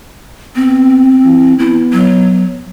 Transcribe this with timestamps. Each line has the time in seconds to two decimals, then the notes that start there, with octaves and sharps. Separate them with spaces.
0.56 B3 C4
1.25 E3
1.59 B3 E4
1.93 F#3